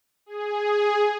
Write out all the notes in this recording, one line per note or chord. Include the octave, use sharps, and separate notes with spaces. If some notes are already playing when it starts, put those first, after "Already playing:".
G#4